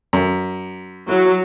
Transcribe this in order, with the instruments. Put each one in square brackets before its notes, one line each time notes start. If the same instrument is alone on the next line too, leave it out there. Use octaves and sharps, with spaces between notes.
[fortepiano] F#2
[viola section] F#3 [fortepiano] E4